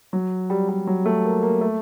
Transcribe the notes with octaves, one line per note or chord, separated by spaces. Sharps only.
F#3
G3
G3
F#3
A3
A#3
A#3
A3